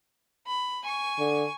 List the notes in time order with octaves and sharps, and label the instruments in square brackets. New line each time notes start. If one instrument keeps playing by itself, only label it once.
[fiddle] B5
G#5 C#6
[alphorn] D3